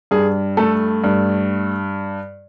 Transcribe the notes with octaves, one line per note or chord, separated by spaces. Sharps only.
G2 G#4
A3 A4
G2